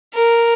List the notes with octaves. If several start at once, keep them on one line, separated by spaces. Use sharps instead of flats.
A#4